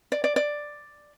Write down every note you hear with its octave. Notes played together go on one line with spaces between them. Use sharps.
D5
D5
D5